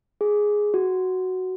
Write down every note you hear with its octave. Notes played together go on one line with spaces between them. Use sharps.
G#4
F#4